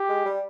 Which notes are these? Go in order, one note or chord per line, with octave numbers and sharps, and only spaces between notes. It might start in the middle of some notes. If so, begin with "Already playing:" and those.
Already playing: G4
G#3
G3